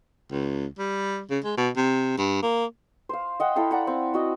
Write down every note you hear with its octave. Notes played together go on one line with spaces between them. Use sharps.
C#2
G3
C#3
G#3
B2
C3
G2
A#3
C5 F5
D#5 F#5 G5
E4 A4 F5 G5
D5 F#5 A#5
C4
C4 F#4 D#5